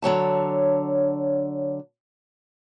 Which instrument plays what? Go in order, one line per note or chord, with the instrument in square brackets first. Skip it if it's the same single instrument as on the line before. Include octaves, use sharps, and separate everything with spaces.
[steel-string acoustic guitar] D3 F#3 C#5 A5